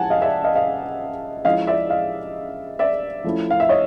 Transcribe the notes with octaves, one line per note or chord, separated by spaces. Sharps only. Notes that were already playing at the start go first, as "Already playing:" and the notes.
Already playing: F3 G#3 C#4 E4 F#5 G#5 A5
D#5 F5
D5 E5
D#5 F5
D#5 F5
F3 G#3 C#4 E4 D#5 F5
D5 E5
D#5 F5
D5 E5
F3 A3 C#4 E4
F5
E5
C#5 D#5